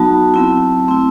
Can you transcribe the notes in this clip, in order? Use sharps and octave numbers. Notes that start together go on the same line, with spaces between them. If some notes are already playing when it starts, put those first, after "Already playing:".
Already playing: F#3 B3 D#4 F#4 A5
F#3 C4 E4
A3 C4 E4